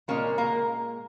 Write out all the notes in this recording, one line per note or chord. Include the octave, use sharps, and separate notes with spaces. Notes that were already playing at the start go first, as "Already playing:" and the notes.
A#2 G#3 A#3 C#4
A#3